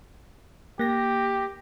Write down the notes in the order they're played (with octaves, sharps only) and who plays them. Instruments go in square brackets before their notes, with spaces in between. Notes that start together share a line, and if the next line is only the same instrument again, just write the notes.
[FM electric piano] A#3 A#6 [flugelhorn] G4